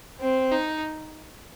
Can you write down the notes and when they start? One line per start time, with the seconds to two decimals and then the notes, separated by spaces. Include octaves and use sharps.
0.21 C4
0.52 D#4